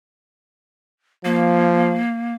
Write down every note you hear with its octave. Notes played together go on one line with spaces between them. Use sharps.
F3 A#3